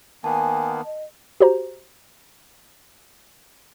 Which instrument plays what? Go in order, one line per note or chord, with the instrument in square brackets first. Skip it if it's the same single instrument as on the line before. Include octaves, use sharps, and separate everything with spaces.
[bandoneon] D#3 A#3 B3 [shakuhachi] G#5 [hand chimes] A5
[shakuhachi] D#5
[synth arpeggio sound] F#4 G4 C5 A#5